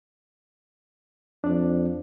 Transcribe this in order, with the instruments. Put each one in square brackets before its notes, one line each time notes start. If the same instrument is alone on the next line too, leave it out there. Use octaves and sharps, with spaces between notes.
[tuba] F2 [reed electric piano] D4 D5